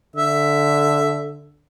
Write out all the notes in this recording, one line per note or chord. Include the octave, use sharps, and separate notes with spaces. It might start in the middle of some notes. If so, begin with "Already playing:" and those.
D3 E5